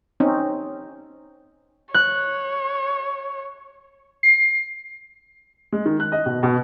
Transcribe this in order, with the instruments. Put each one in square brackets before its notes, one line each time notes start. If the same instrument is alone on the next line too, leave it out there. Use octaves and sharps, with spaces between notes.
[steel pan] C4 C#4 D#4
[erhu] C#5 [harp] F#6
[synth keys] C7
[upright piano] G#3
D#3
F#6
D#5
B2
B2